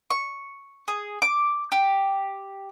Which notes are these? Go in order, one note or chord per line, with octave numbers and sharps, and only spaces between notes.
C#6
G#4
D6
G4